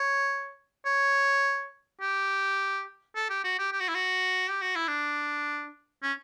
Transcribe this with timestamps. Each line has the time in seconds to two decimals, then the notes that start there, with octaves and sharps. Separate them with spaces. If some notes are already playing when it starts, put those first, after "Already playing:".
Already playing: C#5
0.85 C#5
2.01 G4
3.16 A4
3.29 G4
3.44 F#4
3.58 G4
3.72 G4
3.80 F#4
3.88 E4
3.95 F#4
4.49 G4
4.62 F#4
4.75 E4
4.88 D4
6.03 C#4